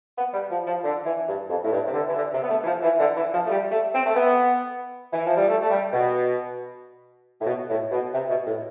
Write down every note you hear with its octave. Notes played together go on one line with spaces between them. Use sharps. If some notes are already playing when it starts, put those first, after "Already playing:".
B3
G3
F3
F3
D3
E3
G2
F2
A2
G2
C3
D3
E3
D3
C3
B3
A3
E3
F3
E3
D3
E3
F3
A3
G3
A3
C4
A3
B3
E3
F3
G3
A3
A3
G3
B2
A2
B2
A2
B2
C3
B2
A2